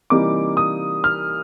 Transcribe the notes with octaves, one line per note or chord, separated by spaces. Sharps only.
C3 E3 G3 A#3 D#4 D6
D#6
F6